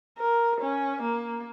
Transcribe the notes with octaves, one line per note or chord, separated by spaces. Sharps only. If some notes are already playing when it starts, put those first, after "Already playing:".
A#4
C#4
A#3